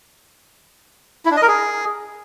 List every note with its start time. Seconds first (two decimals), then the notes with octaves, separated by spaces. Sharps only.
1.25 E4
1.31 D4
1.37 D#5
1.42 A#4
1.48 G#4